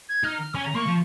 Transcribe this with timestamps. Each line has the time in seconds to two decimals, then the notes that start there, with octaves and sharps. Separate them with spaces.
0.09 G#6
0.23 D#4 F6
0.39 F6
0.54 C#4 G#5
0.65 A#5
0.75 A#3 C#6
0.87 F3